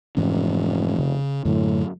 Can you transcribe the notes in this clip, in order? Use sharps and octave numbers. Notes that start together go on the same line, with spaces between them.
F1 G#2 E3 C#4
C#3
F#2 A2 D3 F#3